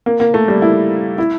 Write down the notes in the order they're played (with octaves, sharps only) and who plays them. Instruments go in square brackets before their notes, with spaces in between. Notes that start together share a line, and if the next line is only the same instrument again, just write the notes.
[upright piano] A#3
A#3
A3
G3
E4
E4